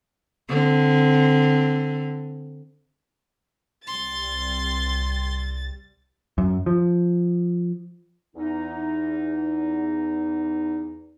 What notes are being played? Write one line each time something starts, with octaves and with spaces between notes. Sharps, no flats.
D3 C4
C2 G3 C6 A6
F#2
F3
E2 D#4